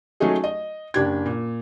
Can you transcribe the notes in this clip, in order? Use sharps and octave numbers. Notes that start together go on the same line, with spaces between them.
F#3 A3 C#4 D#4 G#4
D#5
F#1 D4 G4 G#6
A#2